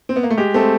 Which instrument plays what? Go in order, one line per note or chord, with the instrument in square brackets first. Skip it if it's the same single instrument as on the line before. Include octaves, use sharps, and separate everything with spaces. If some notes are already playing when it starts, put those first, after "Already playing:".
[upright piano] C4
B3
A#3
A3
[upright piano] G#3 [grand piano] G4
[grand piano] A3 [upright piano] C4